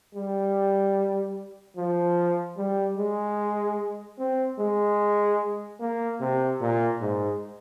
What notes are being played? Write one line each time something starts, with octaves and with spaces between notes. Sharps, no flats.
G3
F3
G3
G#3
C4
G#3
A#3
C3
A#2
G#2